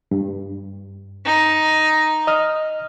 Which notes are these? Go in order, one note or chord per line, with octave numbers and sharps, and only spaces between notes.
G2
D#4
D#5 D#6 F6